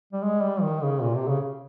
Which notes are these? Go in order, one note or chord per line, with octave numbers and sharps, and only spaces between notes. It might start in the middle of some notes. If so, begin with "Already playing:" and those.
G3
G#3
G3
D#3
C#3
A#2
C3
C#3